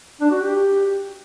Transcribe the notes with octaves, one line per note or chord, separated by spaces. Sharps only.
D4
F#4
G4